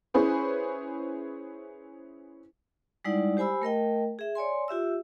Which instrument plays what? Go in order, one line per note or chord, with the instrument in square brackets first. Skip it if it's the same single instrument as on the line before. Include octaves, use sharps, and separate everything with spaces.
[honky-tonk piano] C#4 E4 G#4 B4 C5
[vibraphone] G3 G#3 D#4 E4 D5 F#5
G4 C5 G#5 B5 E6
A3 A#4 D#5 G5
G#4 E5
C#5 D5 G#5 C6
F4 G4 E5 E6